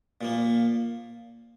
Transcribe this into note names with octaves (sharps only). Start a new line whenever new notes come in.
A#2 F3 A#3